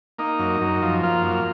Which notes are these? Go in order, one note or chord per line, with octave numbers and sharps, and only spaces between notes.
A#3 D#4
F#2
F#2
F3
A#3 F4
F#2